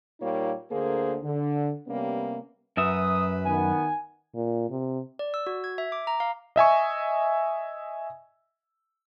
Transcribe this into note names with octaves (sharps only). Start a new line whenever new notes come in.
A#2 G3 A#3 D#4 F4 C#5
D2 D3 A#3 G#4 A#4 C5
D3
C3 G3 A#3 B3 C#4
F#2 F#3 B4 E5 D#6
D#3 B3 G#5
A#2
C3
D5
E6
F#4
G#6
E5
D6
A#5
F5
D#5 E5 G#5 C#6